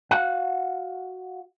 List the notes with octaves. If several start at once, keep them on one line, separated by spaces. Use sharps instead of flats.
F#4 F5 F#5